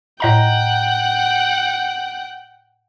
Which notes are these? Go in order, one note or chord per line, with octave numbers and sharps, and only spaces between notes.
A2 D#5 F#5 G5 A#5